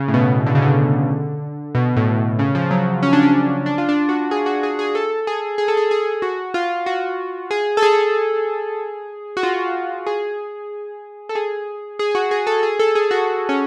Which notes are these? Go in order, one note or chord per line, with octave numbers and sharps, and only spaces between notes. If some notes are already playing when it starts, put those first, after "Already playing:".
Already playing: C#3
A2
B2
D3
C#3
D3
B2
A2
C#3
F3
F#3
C#4
D4
C#4
D4
F4
D4
F#4
G#4
F#4
G#4
G#4
A4
G#4
G#4
A4
G#4
G#4
F#4
F4
F#4
G#4
A4
G#4
F#4
F4
G#4
A4
G#4
G#4
G#4
F#4
G#4
A4
G#4
A4
G#4
F#4
C#4